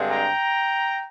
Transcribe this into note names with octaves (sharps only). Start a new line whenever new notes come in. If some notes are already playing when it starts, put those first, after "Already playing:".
Already playing: G2 D3 G#3 C4
G5 A#5